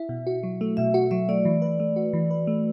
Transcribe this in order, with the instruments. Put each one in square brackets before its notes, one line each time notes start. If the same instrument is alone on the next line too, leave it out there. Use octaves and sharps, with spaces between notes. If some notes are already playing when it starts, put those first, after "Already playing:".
Already playing: [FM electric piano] E4 [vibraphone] E5
[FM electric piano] B2
F#4
F#3
A3
[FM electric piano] B2 [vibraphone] E5
[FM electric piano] F#4 [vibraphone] F#5
[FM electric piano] F#3 [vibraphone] E5
[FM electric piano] A3 [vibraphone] D5
[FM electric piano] E3
B4
A3
F#4
E3
B4
A3